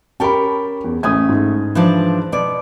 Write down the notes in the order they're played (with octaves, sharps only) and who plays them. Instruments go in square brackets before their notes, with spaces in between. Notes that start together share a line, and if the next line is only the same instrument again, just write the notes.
[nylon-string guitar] C#4 G4 A#4 [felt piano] A5 B5
[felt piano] E2
[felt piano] A1 D#6 G#6 [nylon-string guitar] A3 G#5
[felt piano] G#2
[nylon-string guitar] E3 F3 D4
B2 D5